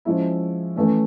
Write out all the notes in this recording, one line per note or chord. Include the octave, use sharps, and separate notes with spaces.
F3 G#3 C#4 E4
E3 A3 C#4